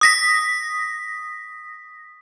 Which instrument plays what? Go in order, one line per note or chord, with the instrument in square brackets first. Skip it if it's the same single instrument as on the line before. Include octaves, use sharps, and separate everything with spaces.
[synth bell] D#6 A#6 B6